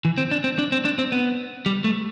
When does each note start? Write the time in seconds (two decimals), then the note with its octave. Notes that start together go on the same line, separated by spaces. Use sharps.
0.05 E3
0.18 C4
0.31 D4
0.44 C4
0.59 D4
0.72 C4
0.85 D4
0.99 C4
1.12 B3
1.66 G3
1.84 A3